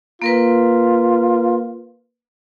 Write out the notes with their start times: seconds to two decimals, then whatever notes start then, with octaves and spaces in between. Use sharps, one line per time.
0.22 A#3 F4 A#4 B4